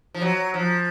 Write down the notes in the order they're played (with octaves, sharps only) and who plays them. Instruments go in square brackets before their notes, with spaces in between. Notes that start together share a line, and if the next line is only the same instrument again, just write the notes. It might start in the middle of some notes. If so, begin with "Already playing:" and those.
[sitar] F3
F#3
F3